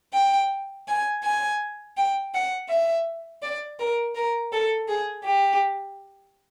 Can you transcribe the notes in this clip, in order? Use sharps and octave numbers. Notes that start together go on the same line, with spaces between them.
G5
G#5
G#5
G5
F#5
E5
D5
A#4
A#4
A4
G#4
G4